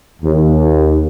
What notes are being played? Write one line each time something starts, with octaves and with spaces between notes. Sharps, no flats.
D#2